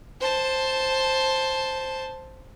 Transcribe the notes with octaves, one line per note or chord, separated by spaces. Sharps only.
C5 A5